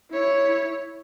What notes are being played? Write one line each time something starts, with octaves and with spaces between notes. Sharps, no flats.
E4 C#5